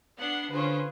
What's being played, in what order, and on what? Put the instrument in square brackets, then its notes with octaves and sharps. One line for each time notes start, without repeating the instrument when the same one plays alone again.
[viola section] B3 D4 [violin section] F#5 C7
[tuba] D3 [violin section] C#4 F4 C5 [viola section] G#4 [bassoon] B4